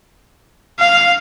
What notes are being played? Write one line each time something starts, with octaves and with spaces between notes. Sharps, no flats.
F5